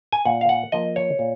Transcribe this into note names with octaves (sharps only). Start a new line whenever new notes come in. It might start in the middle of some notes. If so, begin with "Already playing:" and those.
G#5
A#2 F#5
F5
F#5
F3 A#3 D#5
C#5
A#2